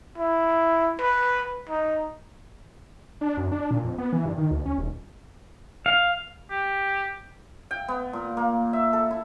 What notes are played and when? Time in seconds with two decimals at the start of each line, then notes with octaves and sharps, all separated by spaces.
0.18 E4
1.00 B4
1.69 D#4
3.21 D4
3.37 F#2
3.52 D4
3.71 A#2
3.84 F2
3.98 B3
4.13 E3
4.26 G2
4.38 D#3
4.51 D2
4.65 C#4
4.78 D#1
5.86 F5
6.51 G4
7.71 G5
7.88 B3
8.13 A#2
8.37 A#3
8.73 E5
8.93 A4
9.11 E4